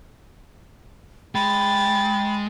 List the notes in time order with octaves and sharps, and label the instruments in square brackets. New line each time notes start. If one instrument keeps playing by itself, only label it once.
[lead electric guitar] G#3 [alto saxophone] G5 [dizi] B5 [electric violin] A6